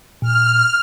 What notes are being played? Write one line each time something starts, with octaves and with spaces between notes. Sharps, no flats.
A#2 F6